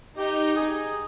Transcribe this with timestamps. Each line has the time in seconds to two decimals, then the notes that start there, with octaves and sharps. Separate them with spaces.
0.17 D#4 G4
0.56 G#4